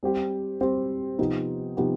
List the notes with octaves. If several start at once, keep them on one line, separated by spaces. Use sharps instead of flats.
G3 C4 G4
G3 C4 G4
C3 F3 B3 D#4 G4
C3 F3 B3 D#4 G4